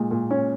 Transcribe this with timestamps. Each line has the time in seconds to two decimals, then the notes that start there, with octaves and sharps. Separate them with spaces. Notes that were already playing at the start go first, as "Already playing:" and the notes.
Already playing: A#2 G#3
0.11 A#2
0.31 C#4